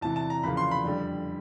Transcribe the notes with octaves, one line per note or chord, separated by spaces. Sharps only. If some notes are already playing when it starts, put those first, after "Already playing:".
E2 C3 E3 A5
A5
A#5
E2 C#3 F3 A#3 B5
C6
B5
F2 D3 G3